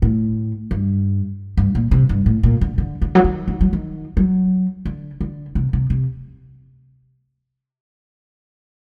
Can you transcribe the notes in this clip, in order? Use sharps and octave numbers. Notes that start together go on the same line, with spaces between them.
A2
G2
G2
A#2
C3
G2
A2
A#2
D3
D3
D3
F#3
D#3
D#3
F#3
D#3
F#3
D3
D3
C3
C3
C3